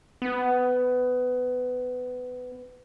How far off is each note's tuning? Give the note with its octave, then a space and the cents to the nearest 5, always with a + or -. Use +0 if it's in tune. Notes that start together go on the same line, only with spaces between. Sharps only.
B3 +20